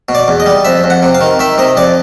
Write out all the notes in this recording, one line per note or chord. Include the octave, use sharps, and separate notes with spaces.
B2
D5
E2
D#5
G3
F2 E5
F2
F#5
C3
F5
D#3
D#3 E5
C3 D#5
F2 D5